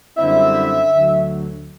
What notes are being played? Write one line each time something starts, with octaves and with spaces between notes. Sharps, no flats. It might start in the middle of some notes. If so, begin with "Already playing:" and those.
F#2 D3 G3 C4 E4 E5
D2 D3 F#3